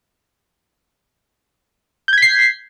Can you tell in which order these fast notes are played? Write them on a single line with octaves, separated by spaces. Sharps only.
G6 G#6 B6 C7